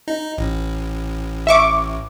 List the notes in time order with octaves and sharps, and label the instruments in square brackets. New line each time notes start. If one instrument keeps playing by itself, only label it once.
[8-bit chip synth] D#4
A1
[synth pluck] E5 C#6 D6